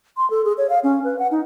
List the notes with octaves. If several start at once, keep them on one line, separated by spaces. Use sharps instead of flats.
C6
A4
G#4
C#5
F5
C#4
B4
F#5
D#4